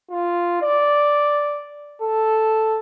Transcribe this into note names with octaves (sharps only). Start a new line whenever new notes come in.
F4
D5
A4